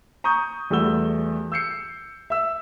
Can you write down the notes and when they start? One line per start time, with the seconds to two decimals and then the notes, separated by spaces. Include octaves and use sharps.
0.24 A#5 C#6 D#6 G6
0.70 E2 G3 A3 F#4 E6 G7
1.52 E6 G6 C7 C#7
2.30 E5 E6